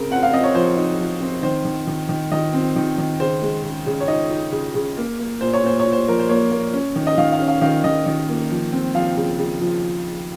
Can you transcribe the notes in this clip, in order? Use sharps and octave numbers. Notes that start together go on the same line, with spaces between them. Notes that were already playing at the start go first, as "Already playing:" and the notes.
Already playing: C#3 C4 A#4
C4 F#5
F5
C4 D#5
C#5
F3 C5
D#4
F3
C4
D#3 C5
D#3
D#3
D#3
D#3 D#5
C4
D#3
D#3
C#3 C5
G#3
C#3
C#3
C#5
D#4 D#5
D#4
C#3
C#3
A#3
A#3
A#2 C5
C#5
A#2 C5
C#5
A#2
C5
F3 A#4
C5
A#3 C#5
A#3
C#4
D#3
D#5
D#3 F5
F5
C#4
F5
D#3 F5
D#3 D#5
D#3
A#3
F3
C4
F3 F5
C#3
C#3
F3